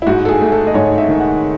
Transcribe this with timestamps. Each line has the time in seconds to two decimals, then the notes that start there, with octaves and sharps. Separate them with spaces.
0.02 E4
0.07 G#2 F#4
0.25 A4
0.29 G#4
0.41 A3
0.52 A4
0.67 D#5
0.74 G#2 C#5
0.98 E5
1.08 D#3
1.20 F#5